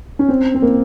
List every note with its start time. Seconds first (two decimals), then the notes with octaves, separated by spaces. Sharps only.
0.19 C#4
0.29 C4
0.54 C4
0.62 A#3